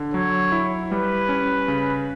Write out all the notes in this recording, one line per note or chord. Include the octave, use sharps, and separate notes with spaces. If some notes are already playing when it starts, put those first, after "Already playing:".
Already playing: D3
F#3 C#5
E4
G3 B4
C#4
C#3